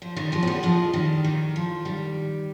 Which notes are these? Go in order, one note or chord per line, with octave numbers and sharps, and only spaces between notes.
F3
D#3 G3
F3 G#3
C4
G3 B3
F3 G#3
D#3 G3
D#3
F3
D#3 G3